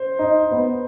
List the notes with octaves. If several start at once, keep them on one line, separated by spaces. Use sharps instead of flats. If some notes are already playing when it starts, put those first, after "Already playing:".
Already playing: C5
D#4
B3